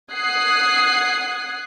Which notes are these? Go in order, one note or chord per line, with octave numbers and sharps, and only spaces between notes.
F#5 D#6 F#6 G#6 C7